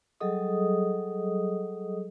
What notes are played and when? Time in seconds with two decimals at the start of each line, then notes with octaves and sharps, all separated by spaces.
0.21 F#3 G3 G#4 A4 D#5 D#6